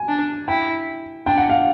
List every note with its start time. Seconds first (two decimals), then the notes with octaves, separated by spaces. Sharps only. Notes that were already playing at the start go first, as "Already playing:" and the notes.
Already playing: G#5
0.08 D4
0.48 E4 G5
1.26 D4 G5
1.38 F#5
1.50 F5